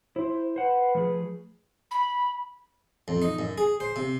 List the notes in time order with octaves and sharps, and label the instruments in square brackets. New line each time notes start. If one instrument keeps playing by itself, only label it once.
[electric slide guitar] E4 [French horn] C5
[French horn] B4 [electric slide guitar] C5 F#5
[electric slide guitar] F3 A3 G#4
[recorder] B5
[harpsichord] F2
D#4
F#2
G#4
C5
C3